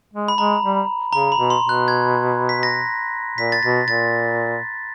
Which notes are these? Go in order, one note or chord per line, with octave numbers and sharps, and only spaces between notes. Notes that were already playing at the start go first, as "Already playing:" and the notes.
G#3
B5
G#3 A#5
G3
C#3 A#5
B5
B2
C6
B2
F#6
G#6
B6
A#6
A#2 B6
A6
B2 A#6
A#2 A6